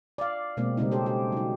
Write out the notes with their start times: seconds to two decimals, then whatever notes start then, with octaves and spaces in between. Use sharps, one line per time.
0.18 D5 F5
0.57 B2 G#3 A#3 C4 D5
0.77 C#3 G3 G#3 A#3 C4 D#4
0.92 C#4 G4 A4 C5
1.06 G4
1.32 F#3 D#4